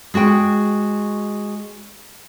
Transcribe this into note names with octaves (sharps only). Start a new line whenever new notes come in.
G#3 F#4 G#4 G5